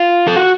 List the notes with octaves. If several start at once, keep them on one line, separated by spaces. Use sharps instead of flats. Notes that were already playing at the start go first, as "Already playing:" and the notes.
Already playing: F4
A4
F#4